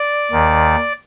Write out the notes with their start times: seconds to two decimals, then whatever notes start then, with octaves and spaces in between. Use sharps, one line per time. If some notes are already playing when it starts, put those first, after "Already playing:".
Already playing: D5
0.32 D#2 D#3